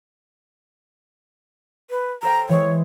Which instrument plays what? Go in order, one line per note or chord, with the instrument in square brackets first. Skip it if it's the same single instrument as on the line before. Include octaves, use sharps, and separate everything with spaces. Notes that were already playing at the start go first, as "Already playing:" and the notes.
[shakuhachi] B4
[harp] A4 C5 G5 [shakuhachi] A#5
[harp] E3 G#3 [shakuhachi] C#5